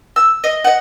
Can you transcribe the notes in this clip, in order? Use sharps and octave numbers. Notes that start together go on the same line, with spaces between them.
E6
D#5
D#5 F#5